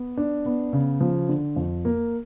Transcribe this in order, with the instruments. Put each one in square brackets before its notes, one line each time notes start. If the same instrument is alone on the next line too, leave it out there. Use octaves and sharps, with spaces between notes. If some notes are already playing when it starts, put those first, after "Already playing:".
Already playing: [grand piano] B3
D4
B3
C#3
F3
D3
F2
A#3